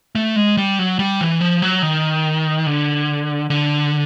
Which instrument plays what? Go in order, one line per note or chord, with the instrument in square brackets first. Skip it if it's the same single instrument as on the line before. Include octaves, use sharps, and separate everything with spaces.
[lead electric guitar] A3
G#3
G3
F#3
G3
E3
F3
F#3
D#3
D3
D3